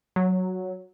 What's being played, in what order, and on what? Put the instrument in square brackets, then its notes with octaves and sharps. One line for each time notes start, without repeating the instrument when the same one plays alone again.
[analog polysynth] F#3